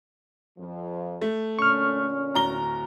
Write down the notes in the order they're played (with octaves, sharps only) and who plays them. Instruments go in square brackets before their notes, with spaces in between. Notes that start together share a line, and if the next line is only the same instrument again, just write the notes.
[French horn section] F2 F3
[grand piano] A3
[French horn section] A#2 D3 C#4 [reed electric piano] C#6 F6
[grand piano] D1 A#5 G7